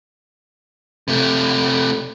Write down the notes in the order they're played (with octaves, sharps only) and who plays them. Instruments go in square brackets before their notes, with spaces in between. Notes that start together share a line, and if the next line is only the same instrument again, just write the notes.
[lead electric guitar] C3 A3